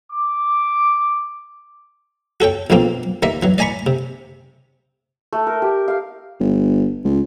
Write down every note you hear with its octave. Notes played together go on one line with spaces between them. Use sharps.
D6
F#4 A4 C#5 G5
A#1 F2 B2 A#3 C4 F4
D#2 A#3 D#5 E5
E3 F#3
D5 D#5 G#5 A#5 B5 C#6
C3
A3
A#4
G4
F5
G1
C#2